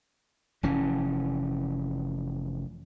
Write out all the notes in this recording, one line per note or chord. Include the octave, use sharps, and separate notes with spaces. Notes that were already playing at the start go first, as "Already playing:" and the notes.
F1 E3 C#4